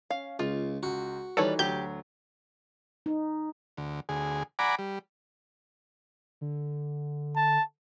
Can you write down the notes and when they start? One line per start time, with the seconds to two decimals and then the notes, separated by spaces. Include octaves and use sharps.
0.10 C#4 F5
0.39 C#2 F4
0.83 C#2 F#4
1.37 D#3 E3 G3 D#4 A4 B4 C#5 D5
1.59 D2 F#3 G4 G6
3.06 D#4
3.77 D2
4.09 D2 G#4
4.59 D5 F#5 G#5 A#5 B5 D6
4.79 G3
6.41 D3
7.36 A5